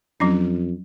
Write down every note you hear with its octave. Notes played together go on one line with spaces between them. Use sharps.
F2 F#3 C#4 D4